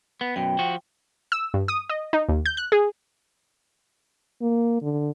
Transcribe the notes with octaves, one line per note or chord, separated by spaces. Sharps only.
B3
F#2 B2 G5
F3 F#4
E6
G2
D#6
D#5
D#4
D#2
G6
F#6
G#4
A#3
D3